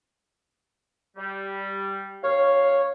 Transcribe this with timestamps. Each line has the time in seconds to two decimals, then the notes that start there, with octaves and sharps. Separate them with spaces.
1.17 G3
2.24 D#2 C#5 F5